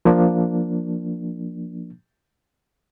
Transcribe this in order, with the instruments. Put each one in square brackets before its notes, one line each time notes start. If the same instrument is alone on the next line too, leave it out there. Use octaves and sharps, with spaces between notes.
[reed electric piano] F3 A#3 D4